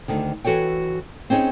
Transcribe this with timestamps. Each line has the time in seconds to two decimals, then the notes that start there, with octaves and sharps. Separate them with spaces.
0.08 D2 D3 D#3
0.44 E3 F#4 A4 C#5 G5
1.30 C4 C#4 D#4 G#4 C#5